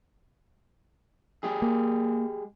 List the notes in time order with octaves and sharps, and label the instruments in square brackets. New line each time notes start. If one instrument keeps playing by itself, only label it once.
[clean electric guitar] G#3 G4 G#4
[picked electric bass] A#3